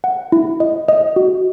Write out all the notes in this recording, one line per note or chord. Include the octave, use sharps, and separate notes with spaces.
F#5
E4
D#5
D#5
F#4